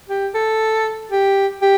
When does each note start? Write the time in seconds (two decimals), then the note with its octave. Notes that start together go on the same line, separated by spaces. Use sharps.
0.09 G4
0.35 A4
1.11 G4
1.62 G4